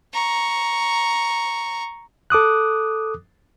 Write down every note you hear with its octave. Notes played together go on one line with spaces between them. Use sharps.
A#5 C#6
A4 D6 D#6 F#6